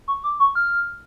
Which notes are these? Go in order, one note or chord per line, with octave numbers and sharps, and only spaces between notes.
C#6
D6
C#6
F6